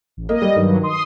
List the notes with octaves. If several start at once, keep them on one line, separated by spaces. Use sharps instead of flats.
A1
A#3 D#5
G3
G2 D#3 F#3
C6 D#6